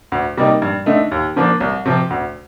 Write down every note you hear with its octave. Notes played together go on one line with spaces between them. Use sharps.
D2
C3 G3 A#3 D#4
G2
D3 A3 D#4
D#2
D3 F3 A#3 D4
C2
C3 F3
D2